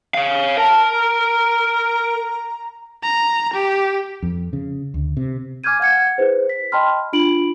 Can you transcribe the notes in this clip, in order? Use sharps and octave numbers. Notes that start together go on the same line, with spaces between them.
C#5 F5
A#4 A5
A#5
A#5
G4
F2
C#3
D2
C3
G#5 D6 F6 G6 G#6 D#7
F5 F#5 G#6 C#7
E4 G#4 B4 C5
B6
D#5 G5 A5 B5 C6 F6
D4 F4 B5 D7 F#7